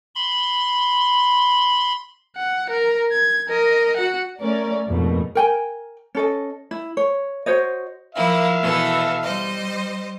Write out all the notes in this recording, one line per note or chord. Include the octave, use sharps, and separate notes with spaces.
B5 C6
F#5
A#4
G#6
A#4 D#5
F#4 F#5
A3 C#4 A#4 D5
F2 G#2 B2 A3 A#3
A#4 G5 G#5
C#4 A4 D#5
E4
C#5
F#4 C5 C#5 D#5
F3 A#3 E4 E5 F5
B2 E3 A4
G3 C5 D#5